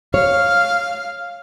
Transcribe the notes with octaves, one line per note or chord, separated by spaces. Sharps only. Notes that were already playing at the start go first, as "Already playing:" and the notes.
C#5 F5